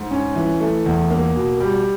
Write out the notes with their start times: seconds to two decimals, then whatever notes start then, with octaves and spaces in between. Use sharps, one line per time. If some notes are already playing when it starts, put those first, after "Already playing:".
Already playing: G#2
0.11 C#4
0.35 E3
0.60 A3
0.86 E2
1.11 A#3
1.36 B2
1.60 G3